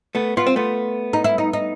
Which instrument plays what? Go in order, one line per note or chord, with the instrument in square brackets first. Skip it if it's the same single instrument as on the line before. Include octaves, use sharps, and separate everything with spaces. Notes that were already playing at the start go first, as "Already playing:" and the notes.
[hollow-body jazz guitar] A3 B3
[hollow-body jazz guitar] B3 [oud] F4
[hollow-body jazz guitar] C4
A3 B3
[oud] D#4
E4
D#4
D#4